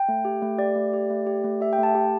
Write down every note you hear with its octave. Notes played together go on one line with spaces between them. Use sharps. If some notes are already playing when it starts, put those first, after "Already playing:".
Already playing: G5
A3
G4
A3
G4 D5
A3
G4
A3
G4
A3
G4 E5
G5
A3 A5
G4